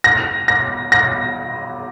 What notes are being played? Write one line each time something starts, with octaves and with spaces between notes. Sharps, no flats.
A#6
A#6
A#6